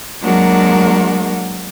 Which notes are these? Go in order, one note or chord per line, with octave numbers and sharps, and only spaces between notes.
F#3 G#3 A#3 D4 F#4 A#4